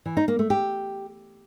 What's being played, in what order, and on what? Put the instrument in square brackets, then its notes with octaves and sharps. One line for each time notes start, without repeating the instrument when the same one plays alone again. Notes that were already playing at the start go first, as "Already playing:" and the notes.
[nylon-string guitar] E3
D#4
A#3
A3
G4